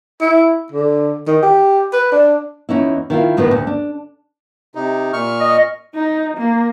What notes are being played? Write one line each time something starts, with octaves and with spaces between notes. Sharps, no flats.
E4
D3
D#3
G4
B4
D4
E2 C#4 D#4 E4
D#3 E4 F4
D2 A2 D#3 B3 B4
D2
D4
C3 D#4
A#2 C#6 F6
D#5
D#4
A#3